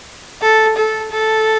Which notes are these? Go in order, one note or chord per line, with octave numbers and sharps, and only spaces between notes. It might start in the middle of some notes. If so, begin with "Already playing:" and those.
A4
A4
A4